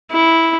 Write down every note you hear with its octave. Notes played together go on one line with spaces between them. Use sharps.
E4